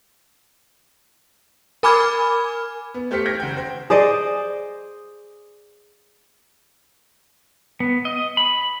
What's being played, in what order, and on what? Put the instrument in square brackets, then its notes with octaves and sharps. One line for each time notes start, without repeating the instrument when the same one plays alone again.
[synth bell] A#4 G#5 B5 D6 F6 G#6
[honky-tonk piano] B3
A3 G4 C5 F6 B6 C#7
F6 G6 G#6 A#6 D7
F#1 F#5 G5
C5 G5
[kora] G#4 C5 D5 D#5
[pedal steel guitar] B3
D#5
B5